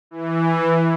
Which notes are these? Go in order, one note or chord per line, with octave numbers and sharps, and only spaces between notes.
E3